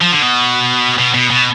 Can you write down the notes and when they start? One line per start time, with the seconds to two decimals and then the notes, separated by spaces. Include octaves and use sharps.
0.01 F3
0.12 D3
0.23 B2
0.98 B2
1.14 B2
1.30 B2